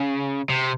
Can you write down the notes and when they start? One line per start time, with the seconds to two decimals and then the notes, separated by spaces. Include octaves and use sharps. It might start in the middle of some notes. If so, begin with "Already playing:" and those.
Already playing: C#3
0.49 C3